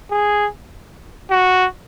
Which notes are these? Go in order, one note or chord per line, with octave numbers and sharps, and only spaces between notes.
G#4
F#4